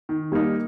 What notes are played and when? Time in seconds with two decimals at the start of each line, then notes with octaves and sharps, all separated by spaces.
0.09 D#3
0.32 G3 A#3 D#4